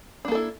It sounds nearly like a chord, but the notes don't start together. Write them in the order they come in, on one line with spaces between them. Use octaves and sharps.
D4 A#3 A4 E4